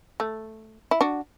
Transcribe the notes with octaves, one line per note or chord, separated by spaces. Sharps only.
A3
E4
D4 F#4